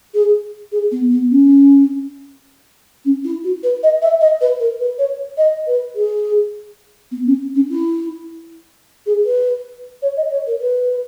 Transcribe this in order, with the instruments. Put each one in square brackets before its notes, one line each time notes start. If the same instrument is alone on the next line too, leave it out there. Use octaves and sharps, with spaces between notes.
[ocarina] G#4
G#4
B3
B3
C#4
C#4
E4
F#4
B4
D#5
E5
D#5
B4
A#4
B4
C#5
D#5
B4
G#4
B3
C#4
C#4
E4
G#4
B4
C#5
D#5
C#5
A#4
B4